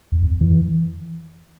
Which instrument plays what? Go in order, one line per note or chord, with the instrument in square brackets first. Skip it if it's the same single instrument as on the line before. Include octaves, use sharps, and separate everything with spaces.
[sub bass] E2
F2
E3